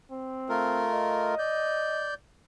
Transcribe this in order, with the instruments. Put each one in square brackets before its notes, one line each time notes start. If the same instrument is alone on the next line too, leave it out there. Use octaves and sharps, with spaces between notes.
[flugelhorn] C4
[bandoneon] A3 F4 A#4
[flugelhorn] D#5
[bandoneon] D5 G6